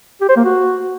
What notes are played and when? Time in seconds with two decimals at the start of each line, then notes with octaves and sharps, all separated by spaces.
0.21 G4
0.29 C5
0.37 A#3
0.44 F#4